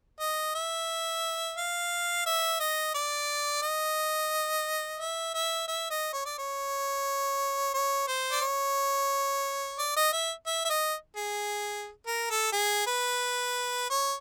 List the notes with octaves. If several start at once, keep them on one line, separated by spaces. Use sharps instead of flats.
D#5
E5
F5
E5
D#5
D5
D#5
E5
E5
E5
D#5
C#5
D5
C#5
C#5
C5
D5
C#5
D5
D#5
E5
E5
E5
D#5
G#4
A#4
A4
G#4
B4
C#5